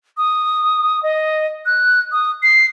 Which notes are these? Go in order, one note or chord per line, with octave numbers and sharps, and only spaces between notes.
D#6
D#5
F#6
D#6
C7